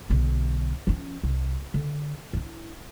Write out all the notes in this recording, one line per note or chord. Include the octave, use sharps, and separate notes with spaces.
B1 D3
F3 C#4
C2
D3
D4 E4